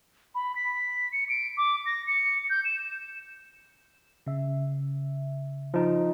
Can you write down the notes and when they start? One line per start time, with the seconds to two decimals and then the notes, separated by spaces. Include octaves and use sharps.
0.35 B5
0.56 B6
1.12 C#7
1.29 D7
1.58 D6
1.86 A#6
2.07 C#7
2.50 G6
2.65 E7
4.27 C#3 E5
5.74 F3 D#4